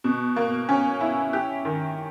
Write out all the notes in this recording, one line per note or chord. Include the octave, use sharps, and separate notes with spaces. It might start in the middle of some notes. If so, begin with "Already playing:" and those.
B2
A#3
C#4
E4
G4
D#3